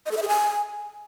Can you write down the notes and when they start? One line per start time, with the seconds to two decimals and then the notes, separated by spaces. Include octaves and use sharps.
0.06 D#5
0.11 A4
0.17 E5
0.22 G#4
0.28 G#5